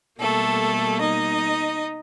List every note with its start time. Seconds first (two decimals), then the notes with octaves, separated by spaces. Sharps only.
0.19 B2 G3 A3 A#3 A4
1.00 D#4 D#5